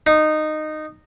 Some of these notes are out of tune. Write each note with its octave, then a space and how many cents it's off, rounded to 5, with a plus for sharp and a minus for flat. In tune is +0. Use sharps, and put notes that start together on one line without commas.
D#4 -15